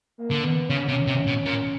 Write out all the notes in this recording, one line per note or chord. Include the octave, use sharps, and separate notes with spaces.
A#3
D3
B3
C#3 C#4
C3
C3
B2
A#2